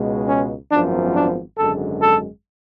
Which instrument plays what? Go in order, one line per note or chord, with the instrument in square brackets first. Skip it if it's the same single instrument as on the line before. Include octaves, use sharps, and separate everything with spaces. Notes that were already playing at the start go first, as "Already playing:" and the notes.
Already playing: [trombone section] C#2 B2 G#3
C#4
G#1 F#2 F3 B3 D4
D4
G#1 F#2 D3 G#3 A4
A4